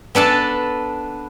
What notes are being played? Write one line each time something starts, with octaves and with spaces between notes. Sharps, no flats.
B3 D4 A4 A5